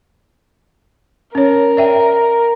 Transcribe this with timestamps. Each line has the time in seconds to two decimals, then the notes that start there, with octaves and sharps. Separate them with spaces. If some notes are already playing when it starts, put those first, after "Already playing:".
1.35 C#4 A#4 C#5
1.77 D5 E5 G5